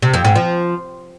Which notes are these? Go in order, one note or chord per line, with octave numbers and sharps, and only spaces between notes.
C3
F2
G#2
F3